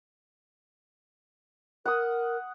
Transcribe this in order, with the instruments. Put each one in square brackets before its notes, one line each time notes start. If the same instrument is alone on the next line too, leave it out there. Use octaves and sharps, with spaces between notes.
[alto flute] A#4 [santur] F#5 D#6